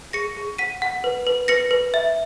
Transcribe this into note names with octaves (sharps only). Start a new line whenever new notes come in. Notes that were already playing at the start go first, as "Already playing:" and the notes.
G#4 A#6 C#7
G#4
F#5 B6 D#7
F#5
B4
B4
B4 A#6 C#7
B4
E5